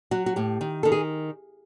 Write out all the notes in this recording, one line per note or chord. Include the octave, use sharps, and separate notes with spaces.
F#3 F#4
F#4
A2 G4
D#3
D#3 A4
G#4